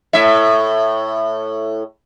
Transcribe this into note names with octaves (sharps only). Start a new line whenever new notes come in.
A2 E5